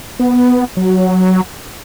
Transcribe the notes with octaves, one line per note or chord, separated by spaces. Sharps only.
B3
F#3